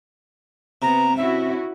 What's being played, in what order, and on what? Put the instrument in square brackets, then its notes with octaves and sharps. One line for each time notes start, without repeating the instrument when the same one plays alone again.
[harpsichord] C3 [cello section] B3 [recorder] A#5
[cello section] C#4 E4 F#4 [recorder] E5